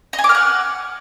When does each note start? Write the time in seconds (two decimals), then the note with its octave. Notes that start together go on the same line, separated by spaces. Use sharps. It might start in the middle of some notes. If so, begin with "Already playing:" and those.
0.13 D#5
0.19 G#5
0.24 D6
0.29 F6
0.35 F#5